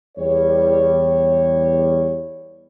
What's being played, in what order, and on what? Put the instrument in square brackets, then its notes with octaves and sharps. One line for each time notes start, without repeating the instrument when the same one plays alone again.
[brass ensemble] E2 G3 C#5